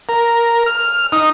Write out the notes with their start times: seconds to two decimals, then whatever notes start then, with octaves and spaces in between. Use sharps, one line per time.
0.09 A#4
0.66 F6
1.12 D#4